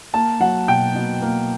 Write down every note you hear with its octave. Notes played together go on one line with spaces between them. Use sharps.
A#3 A5
F#3 F#5
B2 G5
B2
A#3